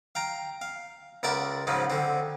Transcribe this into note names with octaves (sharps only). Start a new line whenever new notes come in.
F5 G5 A#5
F5
C#2 A#4 D5 E5 F#5
G#2 C#3 F3 F#3
D3 C4